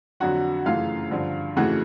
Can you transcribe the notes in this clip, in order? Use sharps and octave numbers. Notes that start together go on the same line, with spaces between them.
F2 D3 F#3 F#4 F#5
F#2 C#3 E3 A3 F4 F5
G2 D3 F3
F2 C#3 E3 A3 F#4 F#5